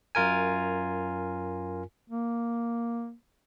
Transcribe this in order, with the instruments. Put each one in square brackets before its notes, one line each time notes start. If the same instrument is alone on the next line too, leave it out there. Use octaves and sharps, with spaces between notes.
[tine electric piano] F#2 F4 A#4 G#5
[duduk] A#3